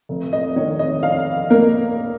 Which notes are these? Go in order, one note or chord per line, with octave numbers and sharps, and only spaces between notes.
F1
D#5
D#3 C#5
D#5
F2 F5
A#3 A#4